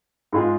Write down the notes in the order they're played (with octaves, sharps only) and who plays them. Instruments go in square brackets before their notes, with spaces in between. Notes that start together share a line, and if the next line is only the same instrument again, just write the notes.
[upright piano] G#2 G#3 F4 G#4